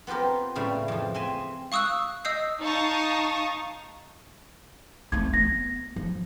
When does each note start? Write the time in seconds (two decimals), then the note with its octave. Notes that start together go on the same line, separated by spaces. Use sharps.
0.07 B3 C4 F4 G4 A#4
0.55 A2 C#3 G3 A3
0.88 F2 F3
1.14 C4 E5 G#5
1.72 F5 C#6 D#6 E6 F#6
2.25 D#5 D#6 E6 G6 C7
2.61 D#4 F5 A5 C#6 D#6
5.12 A3 C4 G#6
5.33 B3 A#6
5.96 F3